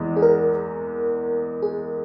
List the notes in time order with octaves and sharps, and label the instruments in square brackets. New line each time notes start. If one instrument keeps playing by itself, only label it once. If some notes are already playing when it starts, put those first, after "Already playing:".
Already playing: [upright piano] E2 E3 G#3
[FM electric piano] G#4
A#4
G#4